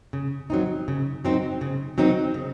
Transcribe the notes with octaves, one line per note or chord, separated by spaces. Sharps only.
C#3
F#3 C4 D#4
C#3
F#3 C4 D#4
C#3
F#3 C4 D#4
C#3